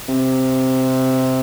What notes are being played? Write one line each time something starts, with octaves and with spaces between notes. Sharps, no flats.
C3